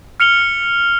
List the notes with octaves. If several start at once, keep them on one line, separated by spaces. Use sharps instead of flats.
F6 C#7 F7 G7